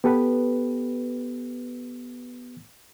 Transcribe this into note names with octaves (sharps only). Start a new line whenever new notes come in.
B3 G4 A4 B4